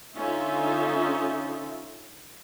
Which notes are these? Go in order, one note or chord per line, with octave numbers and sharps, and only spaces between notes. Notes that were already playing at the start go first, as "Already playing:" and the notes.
D3 C#4 D#4 F4 C5 E5